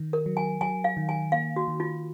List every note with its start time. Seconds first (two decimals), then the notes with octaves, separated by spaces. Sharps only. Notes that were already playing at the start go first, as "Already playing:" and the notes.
Already playing: D#3
0.13 A#4
0.26 F#3
0.37 G#5
0.61 F#3 G#5
0.84 F5
0.97 D#3
1.09 G#5
1.32 A#3 F5
1.56 F#4
1.68 D#3
1.80 F4